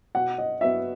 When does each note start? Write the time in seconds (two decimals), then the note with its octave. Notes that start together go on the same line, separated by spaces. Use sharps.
0.15 B2 F#5
0.38 D#5
0.61 F#3 B3 E5